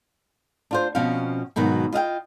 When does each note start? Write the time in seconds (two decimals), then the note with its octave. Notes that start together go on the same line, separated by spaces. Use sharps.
0.71 D4 F4 C5
0.95 B2 F3 C4 C#4 F5
1.56 G#2 B2 D#3 F#3
1.92 F4 D#5 F5 G5